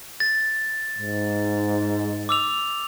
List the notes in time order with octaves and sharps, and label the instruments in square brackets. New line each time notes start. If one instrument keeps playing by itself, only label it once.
[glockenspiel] A6
[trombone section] G#2
[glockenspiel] D6 E6 F7